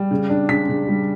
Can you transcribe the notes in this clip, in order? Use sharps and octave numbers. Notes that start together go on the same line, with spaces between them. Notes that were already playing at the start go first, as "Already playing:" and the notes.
Already playing: G3
C#3
D4
C#3 B6
C#3
G3